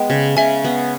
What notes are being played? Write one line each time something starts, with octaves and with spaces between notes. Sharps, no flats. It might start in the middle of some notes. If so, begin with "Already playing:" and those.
Already playing: G#3 B3 D#5 G5
C#3
C#3 E5 G#5
B3